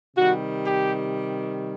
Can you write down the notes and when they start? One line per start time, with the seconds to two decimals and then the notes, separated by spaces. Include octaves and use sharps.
0.16 C3 D#3 G3 F#4
0.64 G4